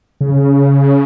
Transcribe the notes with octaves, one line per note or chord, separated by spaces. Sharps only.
C#3